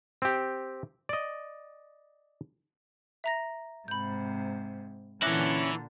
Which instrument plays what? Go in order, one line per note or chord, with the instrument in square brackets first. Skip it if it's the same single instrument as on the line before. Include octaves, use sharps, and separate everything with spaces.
[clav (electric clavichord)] C4 G4
D5 D#5
[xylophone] E5 A#5 A#6
[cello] G#2 C3 [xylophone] B5 G6
[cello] A#2 D3 [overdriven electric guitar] E3 E4 [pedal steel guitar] C#4 [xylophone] D6 F#6 A#6